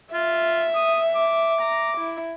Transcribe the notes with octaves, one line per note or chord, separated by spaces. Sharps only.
F4 E5
D#6
D6
A#5
E4